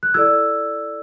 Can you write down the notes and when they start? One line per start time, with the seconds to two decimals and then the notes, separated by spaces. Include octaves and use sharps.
0.03 F#6
0.14 E4 A4 D5 E6 G#6